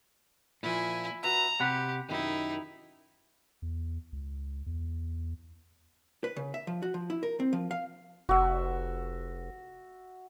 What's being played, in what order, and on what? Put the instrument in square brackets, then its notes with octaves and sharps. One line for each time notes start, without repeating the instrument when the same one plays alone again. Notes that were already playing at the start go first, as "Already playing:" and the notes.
[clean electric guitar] A#2 F3 [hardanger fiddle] E4 G#5
[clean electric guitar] F#4 B4 E5 [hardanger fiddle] A#5
[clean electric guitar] C3 F#5 B5 [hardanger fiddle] G4
[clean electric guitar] F#2 C3 D#3 [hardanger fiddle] D#4 E4
[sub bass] E2
C#2
E2
[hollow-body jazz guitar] B4
C#3
E5
F3
F#4
F3
E4
A#4
C4
F3
F5
[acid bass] F1 [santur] F#4 E5